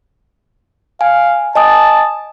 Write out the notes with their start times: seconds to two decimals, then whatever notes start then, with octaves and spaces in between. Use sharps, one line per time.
1.01 F5 G#5
1.55 D#5 G#5 A5 D#6